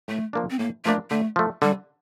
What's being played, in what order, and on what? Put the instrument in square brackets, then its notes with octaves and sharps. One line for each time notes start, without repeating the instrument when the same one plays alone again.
[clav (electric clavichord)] A2 [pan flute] A3
[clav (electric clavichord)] F3 A#3 D4
[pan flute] C4
[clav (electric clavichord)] A2 [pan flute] A#3
[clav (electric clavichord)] F3 A#3 D4 [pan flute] A3
[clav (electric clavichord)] D3 [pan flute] A3
[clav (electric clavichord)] F3 A3
[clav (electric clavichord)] D3 [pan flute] G3